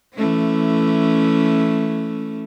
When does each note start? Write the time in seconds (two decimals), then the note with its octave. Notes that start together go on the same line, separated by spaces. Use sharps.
0.15 E3 A3 C#4